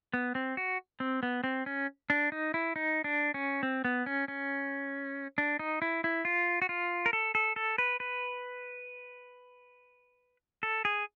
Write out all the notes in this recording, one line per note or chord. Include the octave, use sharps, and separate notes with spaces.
B3
C4
F#4
C4
B3
C4
C#4
D4
D#4
E4
D#4
D4
C#4
C4
B3
C#4
C#4
D4
D#4
E4
E4
F4
F#4
F4
A#4
A4
A4
A4
B4
B4
A4
G#4